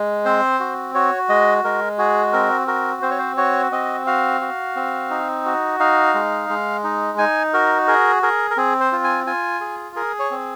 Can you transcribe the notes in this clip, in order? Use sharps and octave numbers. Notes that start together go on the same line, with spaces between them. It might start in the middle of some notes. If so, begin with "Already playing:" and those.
Already playing: G#3
C4 C5
F#4
F#4 C#5
G#3 D#5
G#3 A#4
F#4 G#4
C4 A#4
F#4 A#4
C4 C5
C#5
C5
F#4 C#5
C4 D#5
F#4 F5
F#4
C4
D#4
F#4
D#4 F5
G#3
G#3
D#4
D#4 G#5
F#4 A#4
G#4 A#4
G#4 A#4
A#4
C4 G#4
C5
F4
G#5
F4 G#5
G#4
G#4 A#4
C#5
C4